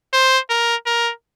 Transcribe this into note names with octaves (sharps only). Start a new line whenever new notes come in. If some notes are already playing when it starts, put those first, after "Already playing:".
C5
A#4
A#4